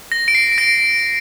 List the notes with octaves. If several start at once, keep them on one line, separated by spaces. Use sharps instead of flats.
A#6
D7
C7
A#6 D7